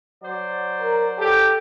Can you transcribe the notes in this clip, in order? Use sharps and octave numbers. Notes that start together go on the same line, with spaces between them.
F#3 C5 D5
A#4
G4 A4